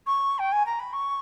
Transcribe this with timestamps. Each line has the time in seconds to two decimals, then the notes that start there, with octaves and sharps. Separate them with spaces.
0.06 C#6
0.38 G5
0.52 G#5
0.66 A#5
0.79 B5
0.93 C#6